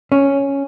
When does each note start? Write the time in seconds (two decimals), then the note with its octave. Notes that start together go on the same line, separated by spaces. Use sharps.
0.12 C#4